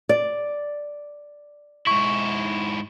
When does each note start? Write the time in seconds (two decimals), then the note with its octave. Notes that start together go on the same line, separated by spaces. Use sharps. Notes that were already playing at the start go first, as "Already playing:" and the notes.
0.09 D5
1.87 G#2 E4 C#6